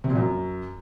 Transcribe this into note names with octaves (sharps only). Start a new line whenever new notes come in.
C3
A#2
F#2